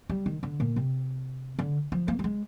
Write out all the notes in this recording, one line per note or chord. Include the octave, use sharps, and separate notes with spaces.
G3
D#3
D3
A#2
C3
D3
F3
A#3
G3
G#3